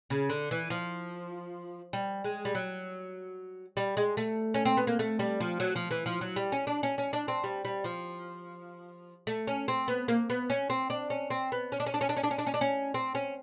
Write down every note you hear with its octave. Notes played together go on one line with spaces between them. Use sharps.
C#3
D3
E3
F3
G3
G#3
G3
F#3
G3
G#3
A3
C#4
C4
B3
A#3
A3
G3
F3
F#3
F3
E3
F3
F#3
G3
C#4
D4
C#4
C#4
D4
C4
G3
G3
F3
A3
C#4
C4
B3
A#3
B3
C#4
C4
D4
C#4
C4
B3
C#4
D4
C#4
D4
C#4
D4
C#4
D4
C#4
D4
C#4
D4
C#4
C4
C#4